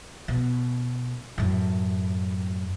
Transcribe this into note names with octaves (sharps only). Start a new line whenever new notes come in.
B2
F#2 A2